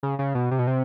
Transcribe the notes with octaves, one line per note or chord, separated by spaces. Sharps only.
C#3
C#3
B2
C3
B2
C3